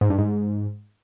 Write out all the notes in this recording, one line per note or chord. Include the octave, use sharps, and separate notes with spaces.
G#2
G2
G#2